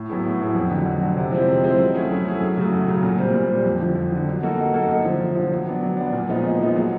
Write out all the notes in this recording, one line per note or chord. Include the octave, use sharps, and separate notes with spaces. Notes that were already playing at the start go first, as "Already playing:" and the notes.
Already playing: A2
F#3 B3 E4 G#4
A2
F#3 B3 E4 G#4
F2
D3 F#3
F2
D3 F#3
C3
F3 G#3 C4 E4
C3
F3 G#3 C4 E4
F#3
A3 C#4 E4 G#4
F#3
A3 C#4 E4 G#4
F#2
C#3 F#3 A3
F#2
C#3 F#3 A3
A#2
G3 C4
A#2
G3 C4
F2
D3 F3
F2
D3 F3
F#3
A#3 D#4 F#4 A4
F#3
A#3 D#4 F#4 A4
F#2
D3 F3
F#2
D3 F3
F#3
B3 D4
F#3
B3 D4
A#2
F3 G#3 B3 D#4
A#2
F3 G#3 B3 D#4
F#3